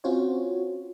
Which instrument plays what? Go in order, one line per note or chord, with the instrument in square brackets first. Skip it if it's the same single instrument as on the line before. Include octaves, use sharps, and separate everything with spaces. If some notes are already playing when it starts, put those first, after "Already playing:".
[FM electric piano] C4 C#4 F4 F#4 C5 C#5